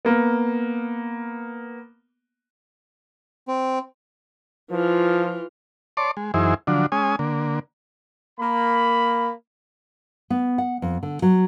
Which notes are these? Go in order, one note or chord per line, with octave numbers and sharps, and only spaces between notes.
A#3 B3
C4
E3 F3 F4
C#5 D5 A5 C6 D6
G#3
F#2 E3 D#4 E4 G#4 C5
D3 F3 F#3 D4
G#3 C#4 G#5 D#6
D3 A#3
A#3 B5
B3
F#5
F2
D3
F#3